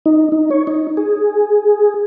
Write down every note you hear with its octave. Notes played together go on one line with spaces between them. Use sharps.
D#4
D#4
C#5
D#4
G#4